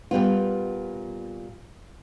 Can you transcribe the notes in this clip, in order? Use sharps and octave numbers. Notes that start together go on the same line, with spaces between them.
A#2 G3 B3 F4